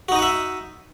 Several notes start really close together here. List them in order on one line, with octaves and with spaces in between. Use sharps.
F#4 D#4 D#5 F#5 E5